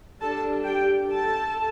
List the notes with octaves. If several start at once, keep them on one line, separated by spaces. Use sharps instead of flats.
G3 D4 A4 A5
G4 G5
A4 A5